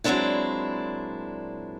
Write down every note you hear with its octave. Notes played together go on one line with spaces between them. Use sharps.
A#2 F#3 G#3 C4 D4 E4